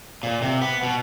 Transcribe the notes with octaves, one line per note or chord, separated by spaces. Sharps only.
A#2
C3
B3
B2